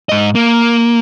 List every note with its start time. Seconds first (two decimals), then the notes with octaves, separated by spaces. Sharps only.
0.09 G#2 D#5
0.35 A#3